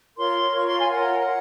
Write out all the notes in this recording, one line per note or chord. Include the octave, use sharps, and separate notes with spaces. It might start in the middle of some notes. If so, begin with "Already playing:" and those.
F4 A#4 C#5 C6
F4 A#4 C#5 C#6
C6
G#5
F4 A#4 C#5 F#5